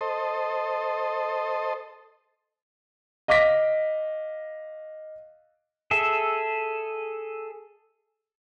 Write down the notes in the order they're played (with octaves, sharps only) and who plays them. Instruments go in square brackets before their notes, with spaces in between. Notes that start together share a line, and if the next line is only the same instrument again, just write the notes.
[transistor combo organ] A4 C5 D#5
[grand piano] D#5 F5 D6 A#6 B6 D7
[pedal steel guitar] G#4 A4 E5